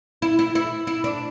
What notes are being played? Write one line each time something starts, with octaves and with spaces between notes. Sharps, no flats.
E4
E4
E4
E4
D4